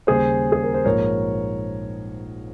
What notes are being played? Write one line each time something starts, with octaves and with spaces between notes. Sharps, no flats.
D#2 C#3 G3 G#4 C5
G#4
A#4
C5
A#1 G#2 F3 A#4 C#5